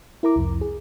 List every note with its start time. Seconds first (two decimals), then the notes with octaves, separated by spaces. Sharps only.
0.23 E4 A#4 A#5 D6
0.36 C2 F2
0.61 G#4